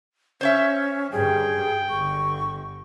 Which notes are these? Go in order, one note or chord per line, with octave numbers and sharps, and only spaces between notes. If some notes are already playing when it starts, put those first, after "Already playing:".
C#4 C5 C#5 E5
G2 D3 G3 G#4 G5
G1 D3 C#6